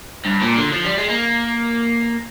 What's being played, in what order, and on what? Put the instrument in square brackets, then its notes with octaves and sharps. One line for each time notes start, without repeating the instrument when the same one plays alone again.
[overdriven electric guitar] G2
A#2
D3
F3
G3
G#3
A#3